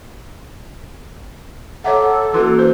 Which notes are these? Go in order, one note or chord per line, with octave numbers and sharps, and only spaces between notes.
A4 C#5 E5 F#5 A#5 D6
E3 A#3 C#4 F#4 C6
C5